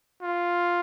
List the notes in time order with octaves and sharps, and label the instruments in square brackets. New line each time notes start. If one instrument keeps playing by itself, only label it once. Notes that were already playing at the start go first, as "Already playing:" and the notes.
[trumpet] F4